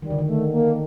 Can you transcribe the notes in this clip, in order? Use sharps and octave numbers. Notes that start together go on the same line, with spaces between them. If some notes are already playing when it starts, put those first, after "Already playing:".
D#3 G3
D3
D#3
A3
A#3